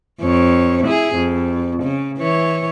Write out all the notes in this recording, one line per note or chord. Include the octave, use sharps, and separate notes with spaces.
F2 C#5
E4 G#4
F2
C#3
E3 C#5